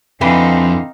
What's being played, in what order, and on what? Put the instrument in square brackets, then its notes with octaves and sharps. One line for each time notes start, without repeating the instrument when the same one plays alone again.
[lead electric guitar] F2 [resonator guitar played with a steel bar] D3 E3 B4 [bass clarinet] C4 [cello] D#4 F5